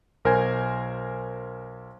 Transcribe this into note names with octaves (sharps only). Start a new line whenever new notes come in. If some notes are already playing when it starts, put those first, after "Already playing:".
B1 A#4 C5 G#5 G#6